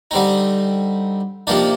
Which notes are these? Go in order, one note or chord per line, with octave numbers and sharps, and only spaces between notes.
D3 G3 C4 D#4
C3 F3 A#3 D4 D#4